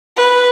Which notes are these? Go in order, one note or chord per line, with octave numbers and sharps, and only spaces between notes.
B4